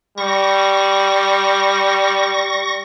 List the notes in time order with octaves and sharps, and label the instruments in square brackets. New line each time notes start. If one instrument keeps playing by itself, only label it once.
[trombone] G3 [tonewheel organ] C#6 A#6